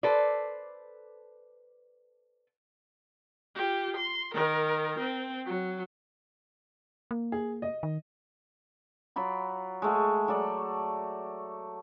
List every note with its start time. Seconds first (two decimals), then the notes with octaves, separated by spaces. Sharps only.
0.03 A4 B4 C5 D5
3.55 F4 G4
3.96 C6
4.34 D#3 A#4
4.99 C4
5.46 F#3
7.11 A#3
7.32 G#4
7.62 D#5
7.83 D#3
9.16 F#3 F4 B5 D6
9.82 G#3 A3 F#4
10.28 F#3 A4 D5